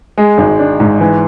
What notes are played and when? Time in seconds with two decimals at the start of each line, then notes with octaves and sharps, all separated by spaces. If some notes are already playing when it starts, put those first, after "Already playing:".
0.17 G#3
0.38 G#1
0.59 D4
0.80 G#2
1.00 E3